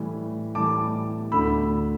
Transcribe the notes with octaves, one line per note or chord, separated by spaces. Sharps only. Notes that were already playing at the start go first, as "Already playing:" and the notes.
Already playing: A2 E3 G3
A2 E3 G3 A5 D6
D2 D3 A3 B5 E6